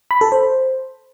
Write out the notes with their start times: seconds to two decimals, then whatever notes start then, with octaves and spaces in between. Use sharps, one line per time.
0.11 B5
0.21 A4
0.32 C5